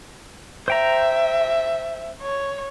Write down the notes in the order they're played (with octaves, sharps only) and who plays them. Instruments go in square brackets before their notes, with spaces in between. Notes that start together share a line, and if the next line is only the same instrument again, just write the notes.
[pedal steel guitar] C5 G5 A#5 [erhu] E5
[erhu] C#5